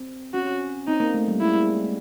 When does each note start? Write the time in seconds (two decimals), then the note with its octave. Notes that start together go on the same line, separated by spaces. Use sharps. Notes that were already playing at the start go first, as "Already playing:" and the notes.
Already playing: C4
0.34 C#4 F#4
0.88 C4 D#4
1.00 A#3
1.14 A3
1.28 G3
1.40 G#3 E4